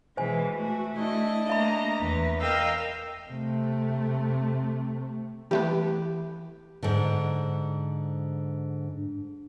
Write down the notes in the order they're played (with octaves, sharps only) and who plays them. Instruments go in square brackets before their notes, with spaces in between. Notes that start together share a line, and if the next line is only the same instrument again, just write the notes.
[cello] B2 E3 [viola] G#3 [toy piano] C5 G#5
[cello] A3 [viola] F#4
[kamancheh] D4 D#5 [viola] E4
[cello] A3 A#3 [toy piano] E5 B5 [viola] A#5
[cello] E2 B4
[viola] A#4 G5 [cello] D#5 F5 [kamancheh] E6
[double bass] C3 A3
[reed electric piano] E3 [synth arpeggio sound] G3 A3 B3 [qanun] G4
[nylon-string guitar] G#2 D3